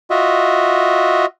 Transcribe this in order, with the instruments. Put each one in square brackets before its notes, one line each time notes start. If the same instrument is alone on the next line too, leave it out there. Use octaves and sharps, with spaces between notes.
[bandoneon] F4 F#4 D#5 E5